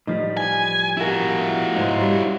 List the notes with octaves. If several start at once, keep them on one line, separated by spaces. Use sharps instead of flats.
A2 F3 G3 D#4
E3 G#5
E4 F#4 G4 A#4
G#2 C#3 D#4 C5
G3 C#4